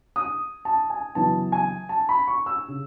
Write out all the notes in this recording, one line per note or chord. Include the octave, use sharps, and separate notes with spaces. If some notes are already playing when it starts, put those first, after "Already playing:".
D#6
A5
G#5
F#1 F#2 E3 B3 A5
G#5
A5
B5
C#6
E6
C#3